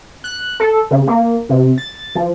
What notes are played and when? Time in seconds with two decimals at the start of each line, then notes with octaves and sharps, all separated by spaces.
0.24 F#6
0.60 A4
0.91 C#3
1.07 A#3
1.49 C3
1.78 A6
2.15 F3